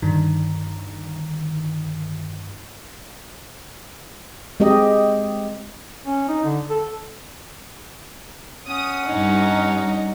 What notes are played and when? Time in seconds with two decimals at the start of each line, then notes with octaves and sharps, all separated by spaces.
0.02 G2 D3 D#3
4.60 G#3 C4 G4 D#5
6.07 C#4
6.29 D#4
6.45 D3
6.70 A4
8.68 C#4 F#5 D#6
9.07 G2 D#4